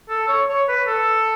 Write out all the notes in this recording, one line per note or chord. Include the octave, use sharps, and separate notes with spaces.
A4
C#5
C#5
B4
A4